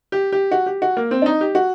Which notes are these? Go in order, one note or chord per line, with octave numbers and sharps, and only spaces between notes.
G4
G4
F#4
G4
F#4
A#3
C4
D4
D#4
G4
F#4